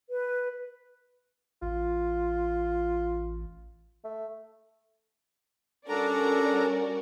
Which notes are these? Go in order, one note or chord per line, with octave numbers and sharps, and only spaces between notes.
B4
A1 F4
A3
G3 C#4 D4 F#4 A4 A#4 D5 A#5